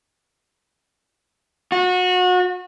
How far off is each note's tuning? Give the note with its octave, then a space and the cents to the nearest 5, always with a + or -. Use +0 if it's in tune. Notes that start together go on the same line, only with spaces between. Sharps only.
F#4 -30